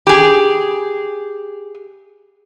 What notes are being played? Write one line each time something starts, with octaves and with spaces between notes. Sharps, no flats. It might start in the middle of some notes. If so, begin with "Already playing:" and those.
G4 G#4